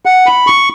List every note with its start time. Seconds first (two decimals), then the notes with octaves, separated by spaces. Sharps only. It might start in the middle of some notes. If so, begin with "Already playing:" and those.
0.06 F#5
0.26 B5
0.47 C#6